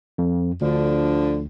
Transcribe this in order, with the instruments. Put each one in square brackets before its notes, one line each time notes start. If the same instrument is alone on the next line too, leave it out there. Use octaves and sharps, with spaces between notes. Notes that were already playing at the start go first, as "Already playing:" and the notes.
[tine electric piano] F2
[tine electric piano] D2 [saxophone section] D3 F3 D4